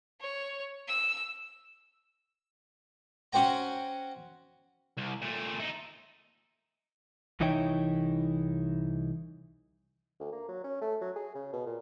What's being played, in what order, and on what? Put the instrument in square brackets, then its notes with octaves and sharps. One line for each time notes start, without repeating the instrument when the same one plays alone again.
[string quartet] C#5
E6
[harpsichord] C#4 F#4 C5 G5 A#5
[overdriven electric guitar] C2
A#2 A3
D#4 E4
[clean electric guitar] C2 E3 D#4 E4 C#5 G5
[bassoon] D2
A#3
F#3
C#4
A3
F#3
G#4
C#3
B2
A#2